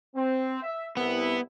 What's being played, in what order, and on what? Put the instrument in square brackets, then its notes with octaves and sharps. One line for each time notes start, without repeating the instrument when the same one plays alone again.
[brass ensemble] C4
E5
[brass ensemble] C2 E4 [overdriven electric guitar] B3